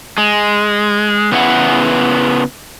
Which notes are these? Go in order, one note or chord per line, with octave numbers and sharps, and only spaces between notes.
G#3
C#3 B3 E4 G#4 F#5